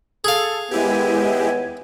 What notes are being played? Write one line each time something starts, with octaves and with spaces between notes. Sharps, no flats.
G#4 A4 F5
D#2 G#3 B3 E4 G4 G#5